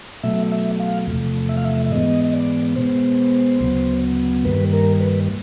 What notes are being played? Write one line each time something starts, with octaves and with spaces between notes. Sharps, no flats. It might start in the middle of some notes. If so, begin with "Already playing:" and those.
B2 F#3 A3 E5
E5
F5
E2 C3 F3 A3
E5
F5
E5
E5
G#2 E3 G#3 B3 D#5
D#5
D5
B2 G#3 B3 C5
D2 C#3 F#3 B3
G2 D#3 G3 A#3 B4
A#4
B4